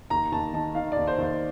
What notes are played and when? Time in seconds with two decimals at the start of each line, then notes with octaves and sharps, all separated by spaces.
0.10 D#2 A#5
0.32 D#2 A5
0.54 D#3 A5
0.75 D#3 F5
0.92 D5
0.97 D#2
1.07 C5
1.18 D#2 C5